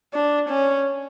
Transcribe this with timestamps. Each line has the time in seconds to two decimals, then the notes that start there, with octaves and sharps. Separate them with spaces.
0.14 D4
0.49 C#4